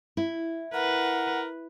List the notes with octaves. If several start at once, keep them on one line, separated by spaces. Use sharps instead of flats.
E4
A#4 B4 F#5